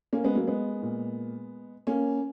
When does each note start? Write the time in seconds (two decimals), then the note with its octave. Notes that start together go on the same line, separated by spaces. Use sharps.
0.13 A#3 C#4
0.24 G#3 B3
0.35 F#3 A#3
0.48 G#3 B3
0.82 A#2
1.87 A#3 C#4